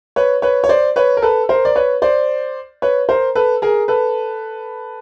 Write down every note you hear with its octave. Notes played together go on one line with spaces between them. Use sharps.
B4 C#5
B4 C#5
C#5
C5 D5
B4 C#5
A#4
A4 B4
A#4 C5
D5
B4 C#5
C5 D5
B4 C#5
A#4 C5
A4 B4
G#4 A#4
A4 B4